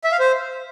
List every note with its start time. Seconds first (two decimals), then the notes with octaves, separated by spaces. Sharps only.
0.04 E5
0.12 F5
0.20 C5